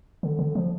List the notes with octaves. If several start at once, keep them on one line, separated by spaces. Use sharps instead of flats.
D3
D3
F3